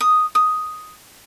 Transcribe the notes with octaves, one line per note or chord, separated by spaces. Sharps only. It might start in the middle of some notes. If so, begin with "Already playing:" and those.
D#6
D#6